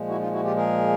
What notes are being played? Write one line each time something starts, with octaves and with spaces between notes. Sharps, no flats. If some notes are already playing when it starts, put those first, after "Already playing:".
Already playing: A#2 F3 G#3
E4 F#4
D#4 F4
E4 F#4
F4 G4
G#4 A#4